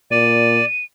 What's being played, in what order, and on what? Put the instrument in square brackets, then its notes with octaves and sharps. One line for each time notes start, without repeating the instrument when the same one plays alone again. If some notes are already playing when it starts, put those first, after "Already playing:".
[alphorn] A#2 [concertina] D5 [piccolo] D#7